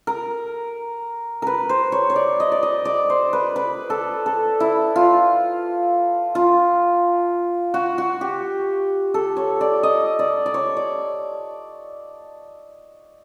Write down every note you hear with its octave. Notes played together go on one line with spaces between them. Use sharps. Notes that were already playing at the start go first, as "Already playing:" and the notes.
A#4
A#4 B4
C5
C#5
C#5
D5
D#5
D5
D#5
D5
C5
B4
B4
A4
A4
E4
F4
F4
F#4
F#4
G4
A4
C#5
D5
D#5
D5
D5
C#5
D5